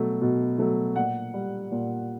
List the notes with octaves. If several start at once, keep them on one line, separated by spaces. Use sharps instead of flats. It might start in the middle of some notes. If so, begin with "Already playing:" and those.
Already playing: B2 F#3 A3
B2
F#3 A3
A#2 F#5
G3
A#2